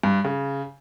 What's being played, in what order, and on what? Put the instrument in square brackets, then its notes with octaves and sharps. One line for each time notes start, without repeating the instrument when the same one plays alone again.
[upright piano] G2
C#3